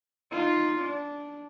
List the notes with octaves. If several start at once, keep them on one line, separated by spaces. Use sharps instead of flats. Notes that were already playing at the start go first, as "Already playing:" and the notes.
D#4 F4
D4